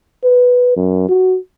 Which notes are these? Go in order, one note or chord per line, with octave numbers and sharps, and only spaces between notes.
B4
F#2
F#4